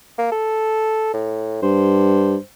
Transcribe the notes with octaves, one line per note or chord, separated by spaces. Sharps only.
A#3
A4
A2
G2 C5